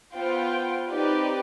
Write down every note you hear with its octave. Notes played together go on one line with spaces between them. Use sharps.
B3 F4 C5 G5
C4 D#4 G4 B4 D5